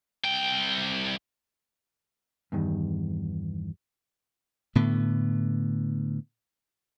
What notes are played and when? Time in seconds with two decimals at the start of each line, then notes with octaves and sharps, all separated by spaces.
0.25 C2 G5
2.52 E2 G2 D#3
4.75 A2 D3 B3